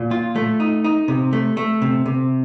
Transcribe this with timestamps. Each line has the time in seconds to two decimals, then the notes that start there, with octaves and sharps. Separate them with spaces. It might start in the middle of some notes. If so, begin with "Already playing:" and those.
Already playing: A#2
0.11 F4
0.36 A3
0.60 D#4
0.84 D#4
1.08 C3
1.33 A3
1.57 A3
1.82 C3
2.06 C3